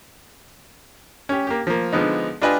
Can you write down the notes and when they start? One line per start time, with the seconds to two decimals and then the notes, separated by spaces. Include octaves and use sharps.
1.29 C#4 G4
1.47 A#3 G4
1.67 F3 A#3
1.92 D3 F3 G#3 B3 D#4
2.42 D4 F4 G4 B4 D#5 G#5